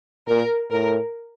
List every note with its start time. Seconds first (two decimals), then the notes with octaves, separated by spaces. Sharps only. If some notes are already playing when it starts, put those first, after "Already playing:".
0.28 A#2 A#4
0.71 A2 A#4